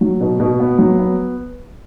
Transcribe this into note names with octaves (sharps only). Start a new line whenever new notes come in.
F#3
B2
B2
B3
F#3
B3